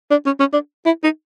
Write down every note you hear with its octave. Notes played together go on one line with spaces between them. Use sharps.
D4
C#4
C#4
D4
E4
D#4